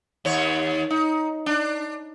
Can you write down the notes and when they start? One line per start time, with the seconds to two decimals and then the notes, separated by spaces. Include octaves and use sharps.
0.25 D#2 C#5
0.90 D#4
1.46 D4